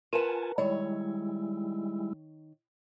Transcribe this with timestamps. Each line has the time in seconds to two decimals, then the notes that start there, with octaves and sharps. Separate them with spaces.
0.13 F4 A#4 B4 F#5 G#5 A5
0.58 D#3 G3 G#3 E4 C#5